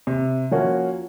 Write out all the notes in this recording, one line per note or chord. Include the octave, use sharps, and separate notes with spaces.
C3
F3 A#3 C#4 F#4